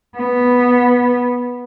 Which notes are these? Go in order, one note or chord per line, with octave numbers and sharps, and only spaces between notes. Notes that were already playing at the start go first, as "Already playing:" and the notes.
B3